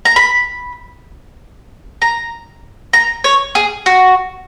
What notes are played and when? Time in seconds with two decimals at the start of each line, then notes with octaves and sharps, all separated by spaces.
0.05 A#5
0.16 B5
2.02 A#5
2.93 A#5
3.24 C#5
3.55 G#4
3.86 F#4